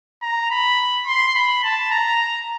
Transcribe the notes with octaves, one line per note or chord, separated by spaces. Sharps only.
A#5
B5
C6
B5
A5
A#5